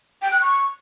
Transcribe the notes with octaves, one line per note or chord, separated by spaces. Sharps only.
G5
F#6
C#6